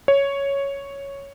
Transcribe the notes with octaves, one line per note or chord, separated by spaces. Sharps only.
C#5